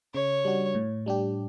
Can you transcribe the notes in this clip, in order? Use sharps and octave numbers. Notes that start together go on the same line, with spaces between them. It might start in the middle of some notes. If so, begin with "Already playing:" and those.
C#3 C#5
G3 D4 F#4
A2
G3 D4 G4